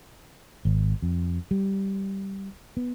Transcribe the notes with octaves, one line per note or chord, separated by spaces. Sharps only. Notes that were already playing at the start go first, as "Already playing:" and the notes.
G#1
F2
G3
B3